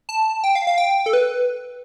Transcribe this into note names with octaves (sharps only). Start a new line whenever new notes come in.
A5
G5
F5
F5
G5
A4
B4